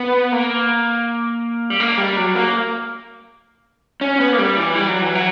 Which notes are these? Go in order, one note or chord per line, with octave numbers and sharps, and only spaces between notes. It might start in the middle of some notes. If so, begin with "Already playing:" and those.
Already playing: B3
A#3
G3
A#3
G3
F#3
A#3
C#4
B3
A#3
G3
E3
G3
F#3
E3
F#3